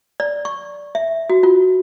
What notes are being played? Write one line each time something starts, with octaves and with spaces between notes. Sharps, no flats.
D5
C#6
E5
F#4
F4